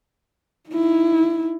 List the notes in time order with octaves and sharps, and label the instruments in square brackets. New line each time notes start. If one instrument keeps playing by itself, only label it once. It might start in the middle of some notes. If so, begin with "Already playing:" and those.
[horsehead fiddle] D#4 E4